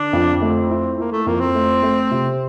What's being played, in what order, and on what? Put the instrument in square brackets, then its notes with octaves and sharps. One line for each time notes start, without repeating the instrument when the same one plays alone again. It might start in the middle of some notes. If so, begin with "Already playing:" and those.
Already playing: [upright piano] D3 [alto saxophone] D4
[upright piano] F2
[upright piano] A3 [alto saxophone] C4
[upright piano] E4
[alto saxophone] A#3 [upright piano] E4
[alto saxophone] A3
[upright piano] F2 [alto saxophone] A#3
[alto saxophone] C4
[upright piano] A3
A3
C3